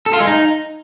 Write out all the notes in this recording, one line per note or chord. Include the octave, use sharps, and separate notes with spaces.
A4
F4
G#3
D#4